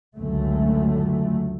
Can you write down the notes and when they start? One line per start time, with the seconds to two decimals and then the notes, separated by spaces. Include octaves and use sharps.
0.15 C#2 F#2 D3 A3